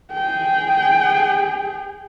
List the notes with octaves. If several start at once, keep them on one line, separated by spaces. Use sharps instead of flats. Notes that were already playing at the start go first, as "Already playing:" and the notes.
G#4 G5